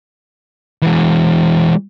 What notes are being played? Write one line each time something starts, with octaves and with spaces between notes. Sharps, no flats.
E3 G#3